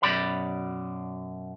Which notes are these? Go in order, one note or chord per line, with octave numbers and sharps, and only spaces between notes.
F#2 B2 D5 B5